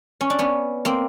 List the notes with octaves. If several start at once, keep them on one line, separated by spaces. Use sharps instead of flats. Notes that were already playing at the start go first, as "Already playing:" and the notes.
C#4
D4
B3 C#4
A#3 C4